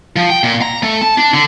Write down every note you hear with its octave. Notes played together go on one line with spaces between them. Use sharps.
F3
G5
A#2
A#5
A3
A5
D4
D3